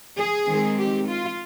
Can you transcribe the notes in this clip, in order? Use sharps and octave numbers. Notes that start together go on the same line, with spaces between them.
G#4
D#3 G#3 C4
G4
F4